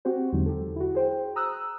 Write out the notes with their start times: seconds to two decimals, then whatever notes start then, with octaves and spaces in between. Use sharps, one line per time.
0.05 C4 F#4 G4 C5
0.32 E2 D3 F#3 G#3 D#4
0.46 G4 A4
0.76 E4 F#4
0.95 G#4 C5 G5
1.36 A#5 D#6 E6 F#6